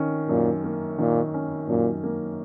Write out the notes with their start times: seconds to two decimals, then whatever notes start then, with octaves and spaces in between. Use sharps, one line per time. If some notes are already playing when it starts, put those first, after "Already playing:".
Already playing: D#3 C#4
0.29 F#2 A#2
0.64 A#3
0.98 A#2 D#3
1.34 C#4
1.68 F#2 A#2
2.03 A#3